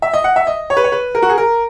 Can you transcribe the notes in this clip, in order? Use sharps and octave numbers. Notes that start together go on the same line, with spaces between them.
E5
D#5
F#5
E5
D#5
C#5
B4
C#5
B4
A#4
F#4
G#4
A#4